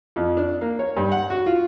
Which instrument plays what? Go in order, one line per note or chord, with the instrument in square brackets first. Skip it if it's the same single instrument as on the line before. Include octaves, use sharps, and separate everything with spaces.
[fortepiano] F2
D4
A#3
C#5
G2
F#5
F#4
F4